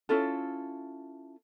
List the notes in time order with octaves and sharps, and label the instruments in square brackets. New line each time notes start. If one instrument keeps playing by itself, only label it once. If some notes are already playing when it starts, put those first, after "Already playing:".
[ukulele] C#4 E4 F4 A4